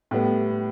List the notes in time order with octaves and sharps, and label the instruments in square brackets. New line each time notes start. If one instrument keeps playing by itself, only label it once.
[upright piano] A2 G3 B3